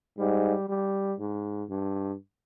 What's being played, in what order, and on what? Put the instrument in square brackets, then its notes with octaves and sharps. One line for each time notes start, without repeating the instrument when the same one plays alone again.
[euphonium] G#2 [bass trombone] G3
[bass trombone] G3
G#2
G2